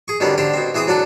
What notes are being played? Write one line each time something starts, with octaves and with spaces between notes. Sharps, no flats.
G#4 C#6
B2 D3 D#3 G3 C#4
D3 D4 G4 C5
B2 C4
E3 C4 G#4 G#5 D#6
F#3 D4 F#4 A4